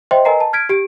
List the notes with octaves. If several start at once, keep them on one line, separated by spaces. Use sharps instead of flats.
C5 D#5 E5 G5 C6
A#4 B4 D#5 G#5 A#5 C7
A5
F6 G#6 B6 D7
G4 D7